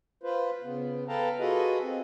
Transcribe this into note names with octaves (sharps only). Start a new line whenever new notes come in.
F4 B4 C5
C#3 B3
A4 B4 F5 G5 A5 A#5
F4 F#4 G#4 A4 B4 D#5
C4